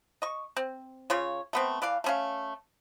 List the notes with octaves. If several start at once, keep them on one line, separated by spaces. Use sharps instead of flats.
D#5 C#6
C4
C#3 F4 C#5
A3 B3 C4
E3 D5 F5
A3 C#4 F5